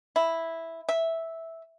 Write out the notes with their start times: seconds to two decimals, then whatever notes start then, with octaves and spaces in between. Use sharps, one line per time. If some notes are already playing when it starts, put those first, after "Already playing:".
0.16 E4
0.89 E5